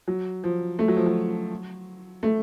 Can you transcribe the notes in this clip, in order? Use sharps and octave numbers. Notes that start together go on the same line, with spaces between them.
F#3
F3
A3
F#3
F3
F#3
A3